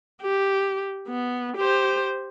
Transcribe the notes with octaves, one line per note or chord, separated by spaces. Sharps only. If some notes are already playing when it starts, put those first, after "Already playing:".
G4
B3
G4 C5